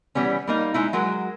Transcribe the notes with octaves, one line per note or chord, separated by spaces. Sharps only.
E3 G3 B3 C#4
G3 A#3 D#4
G#3 D#4 E4
F#3 G#3 F#4 A#4